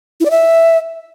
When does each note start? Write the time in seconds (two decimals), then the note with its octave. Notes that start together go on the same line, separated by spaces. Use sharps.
0.20 E4
0.25 D5
0.31 E5